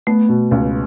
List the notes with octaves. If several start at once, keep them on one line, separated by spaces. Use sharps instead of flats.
A3 B3
B2
C#2